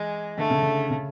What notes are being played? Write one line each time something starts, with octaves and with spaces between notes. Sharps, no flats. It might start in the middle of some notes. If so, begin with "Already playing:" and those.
Already playing: E3 G#3
D3 A3
C#3
D3
C#3